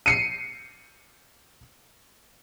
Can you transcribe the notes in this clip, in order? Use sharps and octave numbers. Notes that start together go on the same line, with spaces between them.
C7 C#7 D#7